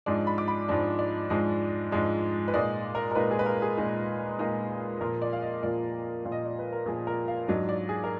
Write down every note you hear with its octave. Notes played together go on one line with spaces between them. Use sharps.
G#2 F3 G#3 D4 D5
B5
D6
B5
G#2 F3 G#3 D4
D5
G#2 F3 G#3 D4 D#5
G#2 F3 G#3 D4
B4
A#2 G#3 D#4 D5
A#4
A#4
A#2 G#3 D#4 B4
G#4
B4
A#4
G#4
A#2 G#3 D#4
A#2 G#3 D#4
A#2 F3 A#3 A#4
D5
F5
D#5
A#2 F3 A#3 D5
A#2 F3 A#3
D#5
D5
B4
A#4
A#2 F3 A#3 G#4
A#4
F5
G#2 F#3 D4 D#5
D5
G#4
A#4